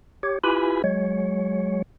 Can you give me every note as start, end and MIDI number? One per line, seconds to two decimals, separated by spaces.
0.23 0.39 67
0.23 0.39 73
0.44 0.82 64
0.44 0.82 65
0.44 0.82 67
0.44 0.82 71
0.44 0.82 80
0.44 0.82 83
0.84 1.82 54
0.84 1.82 56
0.84 1.82 73